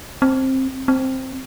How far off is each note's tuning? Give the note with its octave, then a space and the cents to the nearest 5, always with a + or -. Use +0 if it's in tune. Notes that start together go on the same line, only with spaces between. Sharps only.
C4 +15
C4 +5